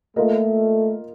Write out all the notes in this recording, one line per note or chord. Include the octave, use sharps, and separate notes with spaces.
A3 A#3 F4 A#4 D#5